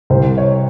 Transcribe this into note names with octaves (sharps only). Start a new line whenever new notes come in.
C2 C5
C#5